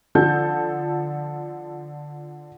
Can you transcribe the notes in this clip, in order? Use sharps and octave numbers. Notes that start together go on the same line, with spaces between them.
D3 F3 A4 G6